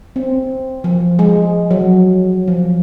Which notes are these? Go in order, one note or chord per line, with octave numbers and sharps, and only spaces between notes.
C4
F3
G#3
F#3
F3